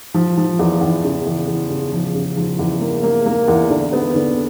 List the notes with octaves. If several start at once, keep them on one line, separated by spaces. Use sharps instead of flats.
F3
F3
E2
E2
C#3
E2
E2
C#3
F3
C#3
F3
E2
A#3
A#3
A#3
E2
D3
B3
D3